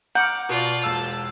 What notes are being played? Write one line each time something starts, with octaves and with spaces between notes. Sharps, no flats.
F#5 A#5 D6 F6 G6
B2 F4 D5
E1 A5 E6